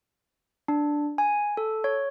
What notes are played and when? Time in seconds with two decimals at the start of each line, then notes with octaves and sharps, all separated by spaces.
0.68 D4
1.18 G#5
1.57 A4
1.84 C#5